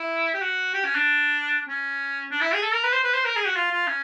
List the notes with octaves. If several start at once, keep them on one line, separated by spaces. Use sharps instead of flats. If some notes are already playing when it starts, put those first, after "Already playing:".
Already playing: E4
G4
F#4
G4
C#4
D4
C#4
D4
E4
G#4
A4
A#4
B4
C5
B4
C5
A#4
G#4
F#4
F4
F4
C#4